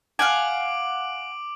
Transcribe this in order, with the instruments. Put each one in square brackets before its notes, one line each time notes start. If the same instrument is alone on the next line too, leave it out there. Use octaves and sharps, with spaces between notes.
[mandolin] F5 F#5 G#5 [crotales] D6 D7 F#7